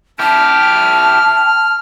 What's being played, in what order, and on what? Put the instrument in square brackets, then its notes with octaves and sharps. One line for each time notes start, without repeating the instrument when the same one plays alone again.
[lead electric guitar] E4 G4 [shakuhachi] A5 [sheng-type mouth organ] F6